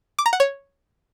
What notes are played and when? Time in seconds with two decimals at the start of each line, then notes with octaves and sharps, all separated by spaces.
0.19 D6
0.26 A#5
0.33 F#5
0.40 C#5